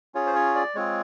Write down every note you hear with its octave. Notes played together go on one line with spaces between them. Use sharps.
C#4 F4 G#4 C#5
C5
C#5
D5
G#3 C4 F4 G#4 C#5